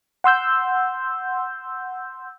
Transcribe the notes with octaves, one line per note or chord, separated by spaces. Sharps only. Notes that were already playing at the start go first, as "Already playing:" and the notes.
F#5 C6 E6 G6